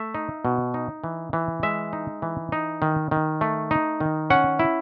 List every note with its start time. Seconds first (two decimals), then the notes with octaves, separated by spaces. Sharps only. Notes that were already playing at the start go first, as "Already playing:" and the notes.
Already playing: A3 E5
0.15 D#4
0.45 B2
0.74 D#4
1.04 E3
1.33 E3
1.63 G#3 E5
1.93 D#4
2.22 E3
2.52 D#4
2.82 D#3
3.11 D#3
3.41 A3
3.71 D#4
4.00 D#3
4.30 C#4 F#5
4.59 E4